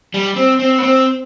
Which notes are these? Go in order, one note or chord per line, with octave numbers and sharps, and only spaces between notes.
G3
C4
C4
B3
C4